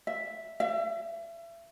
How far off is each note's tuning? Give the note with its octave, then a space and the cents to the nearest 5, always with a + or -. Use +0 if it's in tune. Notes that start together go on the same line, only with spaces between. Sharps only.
E5 +0
E5 +35